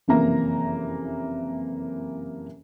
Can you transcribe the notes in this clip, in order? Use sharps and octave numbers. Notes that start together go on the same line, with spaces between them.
F#1 F2 C3 E3 A#3 A#5